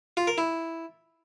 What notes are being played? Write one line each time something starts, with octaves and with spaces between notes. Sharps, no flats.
F4
A#4
E4